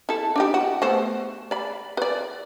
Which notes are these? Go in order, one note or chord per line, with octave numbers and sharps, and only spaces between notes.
E4 A4
D4 D#4 G4
F#4
A3 B3 C5
D5 B5
B4 D5